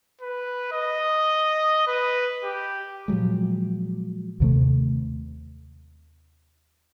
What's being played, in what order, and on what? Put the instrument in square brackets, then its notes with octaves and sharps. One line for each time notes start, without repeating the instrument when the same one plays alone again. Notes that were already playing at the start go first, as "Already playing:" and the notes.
[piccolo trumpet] B4
D#5
B4
G4
[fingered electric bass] A#2 F3 F#3 G#3
D#2 C3 A3